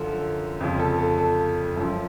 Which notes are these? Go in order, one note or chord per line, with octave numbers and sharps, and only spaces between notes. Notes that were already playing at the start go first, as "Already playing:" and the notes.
Already playing: F#2 D3 F3 A4
F2 C#3 F3
A4
A4
A4
F#2 F3